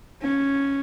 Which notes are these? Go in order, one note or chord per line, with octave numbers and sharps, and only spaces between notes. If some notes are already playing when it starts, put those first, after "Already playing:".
C#4